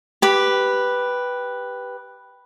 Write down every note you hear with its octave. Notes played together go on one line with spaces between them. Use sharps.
G4 B4